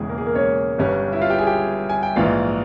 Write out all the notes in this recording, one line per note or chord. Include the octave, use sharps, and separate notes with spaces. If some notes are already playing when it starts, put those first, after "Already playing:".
Already playing: E1 E2 C#3 E3 G#3 G#4
A#3 A#4
G#4
A#3 A#4
C#4 C#5
G1 G2 G3 C#4
E4 E5
F4 F5
G4 G5
G#4 G#5
G4 G5
G#5
G5
A#1 G#2 E3 G#3 F4 F5